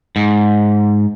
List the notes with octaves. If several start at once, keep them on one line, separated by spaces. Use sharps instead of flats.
G#2